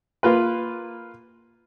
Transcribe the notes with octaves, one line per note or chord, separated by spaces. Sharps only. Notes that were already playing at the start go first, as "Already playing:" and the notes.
A#3 F4 B4